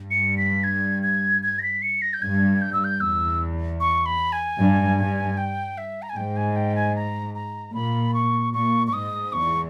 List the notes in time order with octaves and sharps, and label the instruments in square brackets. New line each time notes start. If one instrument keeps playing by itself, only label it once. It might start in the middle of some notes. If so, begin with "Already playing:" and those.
Already playing: [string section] G2
[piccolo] C#7
B6
G#6
G#6
G#6
A#6
B6
C#7
A#6
G6
[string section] G2 [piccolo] G#6
[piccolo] G6
E6
G6
[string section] E2 [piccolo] E6
[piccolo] C#6
B5
G#5
[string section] G2
G2
[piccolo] G5
E5
A#5
G#5
[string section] G#2 [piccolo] G5
[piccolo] G#5
G5
G#5
A#5
A#5
[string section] A#2 [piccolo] B5
[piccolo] C#6
[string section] A#2 [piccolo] C#6
[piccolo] C#6
[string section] G#2 [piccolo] D#6
[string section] E2 [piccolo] C#6